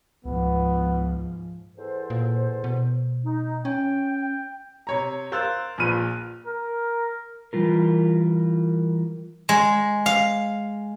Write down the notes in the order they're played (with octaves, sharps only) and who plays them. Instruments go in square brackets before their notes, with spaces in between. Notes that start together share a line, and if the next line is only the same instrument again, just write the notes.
[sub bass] C#2 [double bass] G#2 F3 [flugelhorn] B3
[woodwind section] E2 A4 C5
[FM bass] A#2
B2
[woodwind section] D#4
[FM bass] C#4 [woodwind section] G5
[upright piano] C3 C#5 A#5
A#4 C5 F5 E6 F#6 A6
A#1 A#2 B4 B5 F6 D#7
[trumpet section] A#4
[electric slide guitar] E3 G3 F4 A#4
[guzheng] G#3
F5